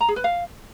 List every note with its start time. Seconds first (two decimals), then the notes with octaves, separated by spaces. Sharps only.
0.01 A#5
0.08 G#4
0.16 B4
0.24 F5